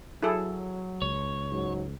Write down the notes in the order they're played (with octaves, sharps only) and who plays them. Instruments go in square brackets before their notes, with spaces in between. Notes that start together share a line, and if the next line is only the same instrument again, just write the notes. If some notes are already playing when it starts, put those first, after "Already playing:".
[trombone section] F#3 [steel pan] E4 G#4 A4
[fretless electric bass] C#2 [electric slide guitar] C#5
[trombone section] G#2 F#3